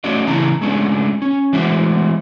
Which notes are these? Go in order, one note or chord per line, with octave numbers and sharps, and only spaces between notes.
A3 C#4 F#4 D5 D#5
C#3 E3 A3 E4 A5 A#5
G#3 A3 C#4 D4 F4
C#4
E3 G#3 A3 F#4 C5 E5